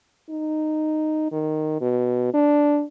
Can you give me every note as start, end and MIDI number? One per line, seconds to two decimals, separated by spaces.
0.30 1.31 63
1.32 1.78 51
1.81 2.30 47
2.34 2.83 62